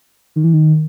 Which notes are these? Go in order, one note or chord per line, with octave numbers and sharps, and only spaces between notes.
D#3
E3
D#3